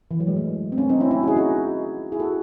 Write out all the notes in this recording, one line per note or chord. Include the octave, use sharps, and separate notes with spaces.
E3
F#3
G#3
A3
C4
A3 C#4
C4 D#4
C#4 E4
C#4 E4
F#4
E4 G#4
D#4 F#4
E4 G#4
F#4 A4